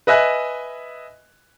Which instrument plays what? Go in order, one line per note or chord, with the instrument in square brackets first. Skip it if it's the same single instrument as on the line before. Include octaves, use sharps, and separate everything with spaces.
[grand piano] B4 D#5 E5 G#5 F#6